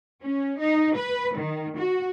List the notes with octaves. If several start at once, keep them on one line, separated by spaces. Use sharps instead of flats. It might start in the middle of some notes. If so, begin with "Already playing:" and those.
C#4
D#4
B4
D#3
F#4